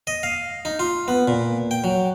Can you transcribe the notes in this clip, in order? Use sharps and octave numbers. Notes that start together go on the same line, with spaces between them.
D#5
F5
D#4
F4
B3
A#2
G5
F#3